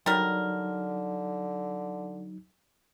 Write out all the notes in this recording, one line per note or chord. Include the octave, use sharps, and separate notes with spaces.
D3 F#3 G3 D#4 A#4